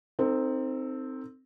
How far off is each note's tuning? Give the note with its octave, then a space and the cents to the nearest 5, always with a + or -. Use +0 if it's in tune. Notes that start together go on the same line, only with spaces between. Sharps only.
C4 +0 D#4 -5 A4 +35